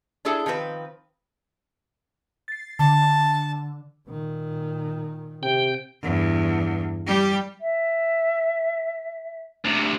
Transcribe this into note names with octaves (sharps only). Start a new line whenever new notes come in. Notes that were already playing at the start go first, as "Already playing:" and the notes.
D4 E4 G#4 A4 E5
D#3 F3 C4 B4
A6 C7
D3 A5
A#2 D#3
C3 G5
E2 G2
G3 G4
E5
D2 C3